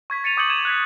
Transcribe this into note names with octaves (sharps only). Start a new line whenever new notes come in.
C#6 G#6 B6
A6 C#7 D#7 F7
D6 D#6 G6 G#6 C#7 F#7
G#6 D#7 E7
F#6 G#6 B6